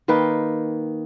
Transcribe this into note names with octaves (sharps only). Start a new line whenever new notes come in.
D#3 A#3 B4 G5